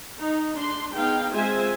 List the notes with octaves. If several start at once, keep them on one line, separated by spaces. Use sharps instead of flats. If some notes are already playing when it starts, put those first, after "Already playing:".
D#4
D4 C6
B3 D#4 G#4 F5 G5
G#3 C4 F4 C5 E5 G#5